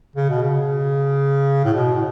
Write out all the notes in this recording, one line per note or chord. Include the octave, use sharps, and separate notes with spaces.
C#3
B2
C#3
A2
B2
A2